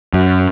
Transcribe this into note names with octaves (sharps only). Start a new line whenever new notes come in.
F#2